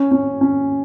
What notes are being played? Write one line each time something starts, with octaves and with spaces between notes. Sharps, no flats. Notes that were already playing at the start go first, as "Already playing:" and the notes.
Already playing: C#4
C#4
C#4